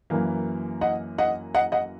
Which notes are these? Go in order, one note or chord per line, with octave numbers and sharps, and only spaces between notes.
F#2 E3 A#3
D#5 F#5
D#5 F#5
D#5 F#5
D#5 F#5